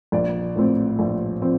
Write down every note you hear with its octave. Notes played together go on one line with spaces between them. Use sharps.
A#1 D5
A2 F3 C4
A#1
F3 C4